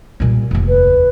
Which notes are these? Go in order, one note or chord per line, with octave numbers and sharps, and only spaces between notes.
A#2 G3
F1 D#2
B4